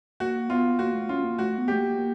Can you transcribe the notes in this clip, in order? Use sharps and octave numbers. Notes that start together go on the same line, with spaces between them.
A#3 F#4
B3 F4
A#3 F#4
A3
C#4 F4
A#3
A3 F#4
B3
A3 G4
A#3
A#3